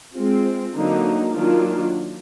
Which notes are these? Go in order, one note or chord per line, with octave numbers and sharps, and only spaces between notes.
G#3 C4 F4
D3 F#3 A#3 D#4
D#3 F#3 A#3 D4 F4